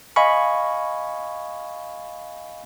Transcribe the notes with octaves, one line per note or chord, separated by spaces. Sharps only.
D#5 F5 G#5 B5 C#6